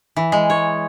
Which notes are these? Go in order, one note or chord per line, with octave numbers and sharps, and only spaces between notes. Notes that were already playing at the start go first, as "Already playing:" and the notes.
E3
G#3
C#5